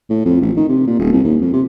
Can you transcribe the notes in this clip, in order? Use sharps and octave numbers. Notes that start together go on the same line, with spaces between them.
A2
F2
A1
D#3
C3
A#2
D#1
C2
D#2
F2
C3